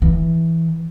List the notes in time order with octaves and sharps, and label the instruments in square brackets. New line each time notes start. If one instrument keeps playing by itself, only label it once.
[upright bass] E3